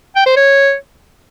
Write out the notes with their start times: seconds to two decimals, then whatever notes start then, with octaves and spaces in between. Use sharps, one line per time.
0.16 G5
0.26 C5
0.36 C#5